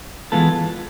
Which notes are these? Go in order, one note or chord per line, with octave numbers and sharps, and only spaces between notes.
E3 G#3 B3 F4 A4